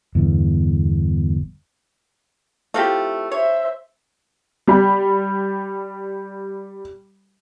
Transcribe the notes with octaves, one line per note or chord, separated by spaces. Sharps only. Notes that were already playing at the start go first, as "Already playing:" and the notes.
G1 E2
A3 C4 E4 F4 G4
C5 C#5 E5
G3 B5